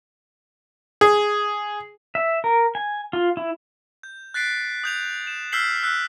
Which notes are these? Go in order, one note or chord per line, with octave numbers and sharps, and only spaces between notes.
G#4
E5
A#4
G#5
F4
E4
G6
F#6 A6 B6 C7 D7
D#6 G6 F7
E7
E6 F6 G6 B6 C7 F#7
E6 F#6 B6